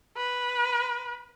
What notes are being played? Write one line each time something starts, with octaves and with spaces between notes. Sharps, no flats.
B4